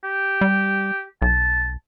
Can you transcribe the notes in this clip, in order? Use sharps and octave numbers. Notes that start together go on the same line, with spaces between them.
G4
G3
B1 A5